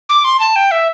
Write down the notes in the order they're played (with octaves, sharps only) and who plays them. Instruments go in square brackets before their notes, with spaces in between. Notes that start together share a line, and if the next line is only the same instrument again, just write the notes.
[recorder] D6
C6
A5
G5
E5